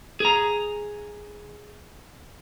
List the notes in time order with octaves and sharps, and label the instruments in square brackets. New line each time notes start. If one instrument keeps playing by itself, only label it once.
[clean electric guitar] G#4 A#5